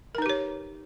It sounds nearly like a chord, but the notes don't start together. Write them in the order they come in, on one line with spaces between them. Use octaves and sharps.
A#4 D#4 B4 G4 C#5